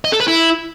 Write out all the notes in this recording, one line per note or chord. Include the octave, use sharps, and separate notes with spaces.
D#5
A4
B4
E4